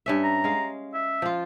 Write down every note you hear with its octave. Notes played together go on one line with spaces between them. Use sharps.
G2 C#4 E5
A#5
G#3 F5
E5
F3 F4